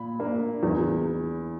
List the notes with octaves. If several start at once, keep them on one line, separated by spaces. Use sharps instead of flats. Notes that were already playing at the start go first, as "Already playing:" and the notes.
Already playing: A#2 B5
A#3 D4
E2